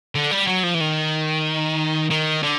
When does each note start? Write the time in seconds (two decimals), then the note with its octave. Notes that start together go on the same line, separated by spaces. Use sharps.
0.15 D3
0.31 G3
0.47 F#3
0.63 F3
0.75 E3
0.81 D#3
2.10 D#3
2.43 D3